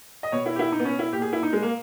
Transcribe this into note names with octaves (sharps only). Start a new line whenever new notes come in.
D#5
B2 C#5
E4
G4
E4
D#4
B3
C#4
E4
A#2 G4
G#4
E4
D#4
G#3
A#3